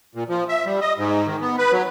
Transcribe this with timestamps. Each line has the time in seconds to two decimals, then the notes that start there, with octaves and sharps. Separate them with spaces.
0.15 A#2
0.29 F3
0.49 E5
0.65 G3
0.81 D#5
0.98 G#2
1.27 D#3
1.41 B3
1.58 B4
1.72 F#3